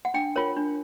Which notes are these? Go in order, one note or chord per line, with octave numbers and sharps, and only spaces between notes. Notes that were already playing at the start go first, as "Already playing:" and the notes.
F#5
D4 G5
F4 A#4 C#5
D4